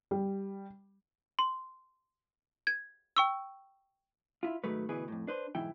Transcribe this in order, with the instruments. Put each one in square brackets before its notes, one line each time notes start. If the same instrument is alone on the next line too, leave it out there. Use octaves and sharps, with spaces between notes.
[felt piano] G3
[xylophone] C6
G#6
G5 C#6 E6
[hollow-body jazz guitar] E4 F4
G#2 D#3 F#3 A3 B4
D2 B2 E3 G#4 B4
F2 A2
D4 B4 C5
B1 G#2 E3 E4 G5